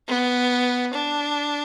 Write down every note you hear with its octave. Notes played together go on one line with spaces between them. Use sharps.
B3
D4